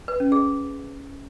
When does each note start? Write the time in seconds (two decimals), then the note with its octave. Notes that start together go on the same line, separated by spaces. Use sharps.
0.08 B4
0.20 C#4
0.32 G#4